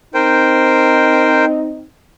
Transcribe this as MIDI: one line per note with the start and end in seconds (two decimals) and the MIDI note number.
0.14 1.84 60
0.14 1.84 63
0.14 1.45 70
0.14 1.45 72
0.14 1.45 79